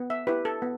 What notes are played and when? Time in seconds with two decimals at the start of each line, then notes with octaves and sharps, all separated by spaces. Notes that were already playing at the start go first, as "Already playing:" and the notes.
Already playing: B3
0.10 E5
0.27 E4 G4 B4
0.45 A4
0.62 B3